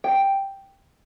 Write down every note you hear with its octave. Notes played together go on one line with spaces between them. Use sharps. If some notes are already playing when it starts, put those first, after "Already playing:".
G5